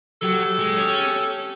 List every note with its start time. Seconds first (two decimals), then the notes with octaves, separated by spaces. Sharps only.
0.22 F#3 G4 A4
0.59 G#3
0.77 C#4